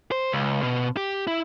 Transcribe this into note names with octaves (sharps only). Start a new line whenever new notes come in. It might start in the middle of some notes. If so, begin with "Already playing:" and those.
C5
C#2
B2
G4
E4